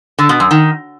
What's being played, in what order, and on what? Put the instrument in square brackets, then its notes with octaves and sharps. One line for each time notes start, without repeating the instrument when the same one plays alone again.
[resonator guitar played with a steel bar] D3
B2
F#2
D#3